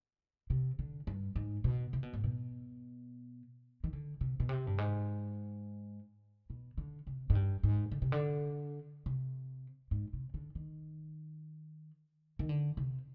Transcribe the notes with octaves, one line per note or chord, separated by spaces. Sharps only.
C3
D3
G2
G#2
B2
C3
B2
G#2
B2
D#3
D3
C3
B2
C3
G2
G#2
B2
D3
C3
G#2
G2
G#2
D3
C3
D3
C3
G#2
C3
D3
D#3
D#3
D3
C3